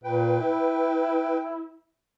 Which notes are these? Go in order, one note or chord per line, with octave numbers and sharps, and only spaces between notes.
A#2 B4 G5
E4